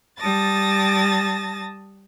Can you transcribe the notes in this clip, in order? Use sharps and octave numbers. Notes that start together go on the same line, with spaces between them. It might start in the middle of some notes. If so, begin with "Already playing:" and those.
G3 A5 D#6 A6 A#6